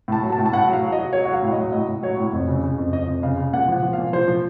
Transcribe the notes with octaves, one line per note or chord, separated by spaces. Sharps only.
A2 A5
F#3
A5
A2
A5
A2 F#5
F#3
F5
F#3
D#5
F#3
F#3 C#5
F#5
F#3
F5
A2
D#5
F#3
A2 D#5
A2
F#3 C#5
A2
F2
C#3
C#3
F2
F2 D#5
F2
C#3 F5
C#3
A#2 F#5
F3 F#5
F3
F5
A#2
F3 C5
F3